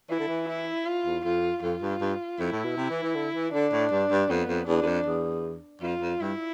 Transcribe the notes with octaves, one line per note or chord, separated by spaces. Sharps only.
E3 E4
D3
E3
E4
F4
E2
F2 F4
F2 F4
G2
G2
F2 E4
A2
B2
C3
E3
E3
D3
E3
D3 D4
A2
G2
G2
F2 B3
F2
E2 D4
E2
F2
E2
F2 F4
F2
G2 E4